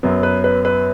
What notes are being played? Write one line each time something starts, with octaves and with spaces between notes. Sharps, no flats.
F#2 F#3 B3
B4
B4
B4